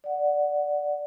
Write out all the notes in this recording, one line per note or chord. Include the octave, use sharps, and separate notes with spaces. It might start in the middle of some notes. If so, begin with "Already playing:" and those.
D5 F#5